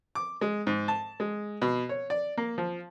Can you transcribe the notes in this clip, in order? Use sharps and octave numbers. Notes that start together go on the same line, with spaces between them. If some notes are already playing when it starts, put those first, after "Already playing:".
D6
G#3
G#2
A5
G#3
B2
C#5
D5
A#3
F3